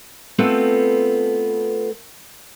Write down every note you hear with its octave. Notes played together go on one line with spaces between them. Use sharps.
A3 B3 C4 F4 A4 B4